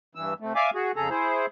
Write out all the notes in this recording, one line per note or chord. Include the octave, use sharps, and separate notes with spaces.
G2 E3 E6
C3 A3
D5 E5 F5 G#5 D6
F#4 G#4
F2 C#3 G#4 A4 A#5
E4 G#4 C5